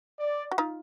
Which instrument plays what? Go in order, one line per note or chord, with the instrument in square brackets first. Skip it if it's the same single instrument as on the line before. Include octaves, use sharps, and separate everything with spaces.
[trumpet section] D5
[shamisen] F#4
D#4 F4